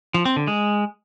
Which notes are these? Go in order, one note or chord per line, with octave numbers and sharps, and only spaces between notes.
F3
C4
D3
G#3